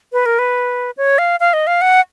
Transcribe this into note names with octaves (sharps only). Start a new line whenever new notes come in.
B4
A#4
B4
C#5
F5
F5
D#5
F5
F#5